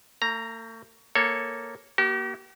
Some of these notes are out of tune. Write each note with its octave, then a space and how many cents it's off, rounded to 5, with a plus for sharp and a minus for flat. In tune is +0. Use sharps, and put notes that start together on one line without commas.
A3 +45 A#5 +0
A#3 +0 A4 +0 C#5 +0
A#3 +30 G4 -45